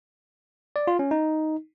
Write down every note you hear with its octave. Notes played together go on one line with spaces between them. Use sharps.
D5
F4
C#4
D#4